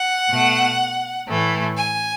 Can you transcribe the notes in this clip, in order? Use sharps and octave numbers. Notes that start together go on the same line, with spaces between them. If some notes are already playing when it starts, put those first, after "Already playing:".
Already playing: F#5
B2 A3
A2 E3 A3
G#5